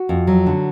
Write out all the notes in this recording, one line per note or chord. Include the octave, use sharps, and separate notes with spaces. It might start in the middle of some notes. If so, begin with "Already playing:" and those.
Already playing: F#4
F2
F#3
D3